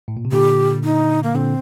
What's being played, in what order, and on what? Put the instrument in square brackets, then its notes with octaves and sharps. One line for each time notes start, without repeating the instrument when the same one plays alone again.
[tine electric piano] A2
A#2
C3
[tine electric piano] A#2 D3 [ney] G4
[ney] D#4
A#3
[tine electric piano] A#2 D3 [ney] C4